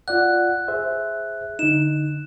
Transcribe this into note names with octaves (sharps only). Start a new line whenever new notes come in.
F4 D5 F#5 F#6
G#4 C5 E5
D3 D#4 E7